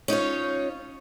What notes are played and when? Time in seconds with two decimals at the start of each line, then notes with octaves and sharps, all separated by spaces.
0.08 C#4 D#4 F4 C#5